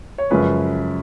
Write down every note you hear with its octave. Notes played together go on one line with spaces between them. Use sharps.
C#5
F#2 C#3 F3 G#3 C#4 B4